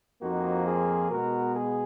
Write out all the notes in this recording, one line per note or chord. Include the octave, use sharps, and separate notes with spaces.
F2 F3 A#3 D#4 F#4
F4 G#4
B2 G#3 B3 F#4 A#4
G#4